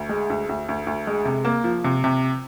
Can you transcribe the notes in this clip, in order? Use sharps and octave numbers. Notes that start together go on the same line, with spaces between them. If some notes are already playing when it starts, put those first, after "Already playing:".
Already playing: D2
G#3
D2
D2
D2
D2
G#3
C3
A#3
F3
C3
C3